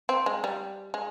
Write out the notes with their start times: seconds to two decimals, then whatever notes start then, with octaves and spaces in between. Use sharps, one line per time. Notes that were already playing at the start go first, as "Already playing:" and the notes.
0.09 C4
0.26 G#3
0.44 G3
0.94 G#3